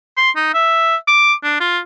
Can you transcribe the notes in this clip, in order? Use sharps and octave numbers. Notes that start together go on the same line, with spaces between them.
C6
D#4
E5
D6
D4
F4